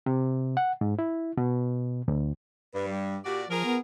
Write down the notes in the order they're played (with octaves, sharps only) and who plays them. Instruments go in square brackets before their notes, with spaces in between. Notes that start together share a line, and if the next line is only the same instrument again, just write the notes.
[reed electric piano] C3
F#5
G#2
E4
B2
D2
[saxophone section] G2 [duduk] B4
[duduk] G3
[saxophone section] A#2 F#4 D5 [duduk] G4
[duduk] F3 [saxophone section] F4 G#4 A#4
[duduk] B3